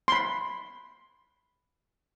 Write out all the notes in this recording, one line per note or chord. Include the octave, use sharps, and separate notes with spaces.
B5 C6